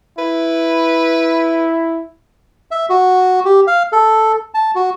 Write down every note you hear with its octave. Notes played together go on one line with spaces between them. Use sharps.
E4 B4
E5
F#4
G4
F5
A4
A5
F#4